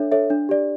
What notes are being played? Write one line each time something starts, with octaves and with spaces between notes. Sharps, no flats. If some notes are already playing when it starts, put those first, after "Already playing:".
Already playing: D4 A4 C#5 E5
A4 C#5 E5
D4
G4 D5